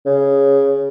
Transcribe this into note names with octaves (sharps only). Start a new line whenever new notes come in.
C#3